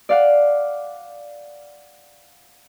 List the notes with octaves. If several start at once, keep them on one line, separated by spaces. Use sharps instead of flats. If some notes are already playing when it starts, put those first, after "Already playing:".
D5 F5 F#5